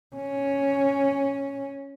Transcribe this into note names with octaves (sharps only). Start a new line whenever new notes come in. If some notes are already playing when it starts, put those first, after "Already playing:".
C#4